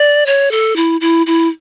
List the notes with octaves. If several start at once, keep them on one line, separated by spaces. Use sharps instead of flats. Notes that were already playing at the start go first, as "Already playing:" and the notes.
Already playing: D5
C#5
A4
E4
E4
E4